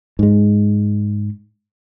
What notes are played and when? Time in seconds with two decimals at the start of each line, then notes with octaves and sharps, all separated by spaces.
0.19 G#2 G#3